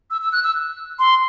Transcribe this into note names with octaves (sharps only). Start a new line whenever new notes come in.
E6
E6
F#6
E6
C6